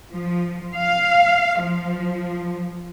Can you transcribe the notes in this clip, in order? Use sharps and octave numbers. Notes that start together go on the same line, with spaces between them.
F3
F5
F3